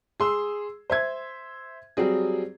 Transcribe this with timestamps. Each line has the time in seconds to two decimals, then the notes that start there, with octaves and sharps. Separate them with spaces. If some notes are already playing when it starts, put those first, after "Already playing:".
0.20 G#4 C6 E6
0.90 C5 E5 G#6
1.97 F#3 G3 C4 G#4